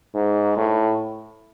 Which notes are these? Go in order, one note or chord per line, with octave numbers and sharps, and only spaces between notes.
G#2
A2